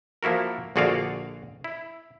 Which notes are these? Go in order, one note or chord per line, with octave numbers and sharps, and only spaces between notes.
F3 A#3 E4 F#4 A#4
A#1 D3 F#4 G#4 D5 F5
E4